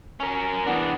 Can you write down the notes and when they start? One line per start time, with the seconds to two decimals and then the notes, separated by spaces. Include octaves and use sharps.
0.20 C#4 A#4
0.66 E3 B3 D4